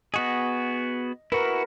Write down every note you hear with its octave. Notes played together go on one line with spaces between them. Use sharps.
B3 F#4 G#4 D#5
E4 F#4 A#4 B4